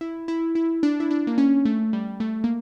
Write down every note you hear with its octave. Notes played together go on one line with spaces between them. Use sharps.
E4
E4
E4
D4
E4
D4
A#3
C#4
A3
G3
A3
A#3